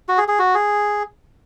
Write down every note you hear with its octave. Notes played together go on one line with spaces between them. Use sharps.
F#4
G#4
G#4
F#4
G#4